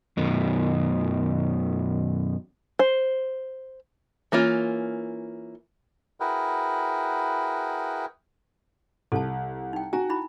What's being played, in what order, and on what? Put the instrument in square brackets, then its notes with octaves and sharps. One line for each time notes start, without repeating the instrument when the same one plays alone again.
[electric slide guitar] F#2 B2 D#3
[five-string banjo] C5
E3 A#3 C#4 F4
[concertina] E4 F#4 G#4 A#4 B4 G5
[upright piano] C2 [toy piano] A4 A5
[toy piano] D#4 G5
[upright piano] F#4 [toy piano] G#5 A#5
[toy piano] D#4 E4 B5